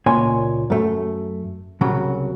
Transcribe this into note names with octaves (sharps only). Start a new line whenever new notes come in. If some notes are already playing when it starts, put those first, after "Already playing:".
C#2 A#2 C#5 G#5 C6
F#2 A3
C2 C#3 F#3